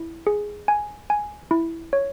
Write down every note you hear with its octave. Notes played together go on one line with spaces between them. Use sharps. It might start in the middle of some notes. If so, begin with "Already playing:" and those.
Already playing: E4
G#4
G#5
G#5
E4
C#5